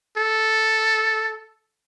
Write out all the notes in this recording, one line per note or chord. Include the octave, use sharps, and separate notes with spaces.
A4